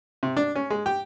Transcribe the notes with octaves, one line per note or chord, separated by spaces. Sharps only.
C3
D4
C#4
G#3
G4